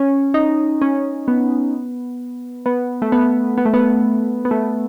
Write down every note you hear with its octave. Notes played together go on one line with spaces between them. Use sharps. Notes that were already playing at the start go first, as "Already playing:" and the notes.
Already playing: C#4
D#4
C#4
B3
B3
A3
B3
B3
A3
B3
B3
A3